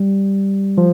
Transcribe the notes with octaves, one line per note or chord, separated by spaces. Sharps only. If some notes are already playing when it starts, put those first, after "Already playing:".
Already playing: G3
F3